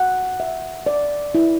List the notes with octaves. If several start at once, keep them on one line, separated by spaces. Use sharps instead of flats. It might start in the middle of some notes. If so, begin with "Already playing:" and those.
Already playing: F#5
E5
D5
E4